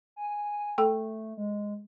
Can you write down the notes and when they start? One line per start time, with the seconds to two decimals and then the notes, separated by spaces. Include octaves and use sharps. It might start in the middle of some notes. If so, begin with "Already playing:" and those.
0.16 G#5
0.78 A3 A4 G5
1.37 G#3